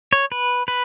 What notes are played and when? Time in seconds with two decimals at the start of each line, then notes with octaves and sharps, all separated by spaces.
0.13 C#5
0.32 B4
0.68 B4